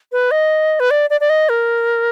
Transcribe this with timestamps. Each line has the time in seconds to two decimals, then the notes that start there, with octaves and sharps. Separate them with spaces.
0.12 B4
0.31 D#5
0.80 B4
0.91 D5
1.10 D5
1.21 D5
1.30 D#5
1.49 A#4